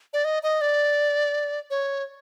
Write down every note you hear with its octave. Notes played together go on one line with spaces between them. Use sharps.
D5
D#5
D#5
D5
C#5